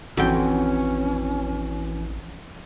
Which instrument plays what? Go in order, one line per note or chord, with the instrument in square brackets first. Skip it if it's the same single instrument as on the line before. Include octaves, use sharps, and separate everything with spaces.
[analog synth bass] A1 [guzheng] F2 G5 [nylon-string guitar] E3 F#4 [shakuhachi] C#4